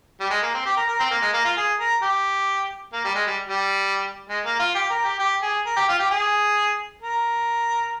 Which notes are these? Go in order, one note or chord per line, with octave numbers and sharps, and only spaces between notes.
G3
G#3
A#3
C4
G4
A#4
A#4
C4
A#3
G#3
A#3
F4
G#4
A#4
G4
A#3
G3
G#3
G3
G3
G#3
A#3
F4
G4
A#4
G4
G4
G#4
A#4
G4
F4
G4
G#4
A#4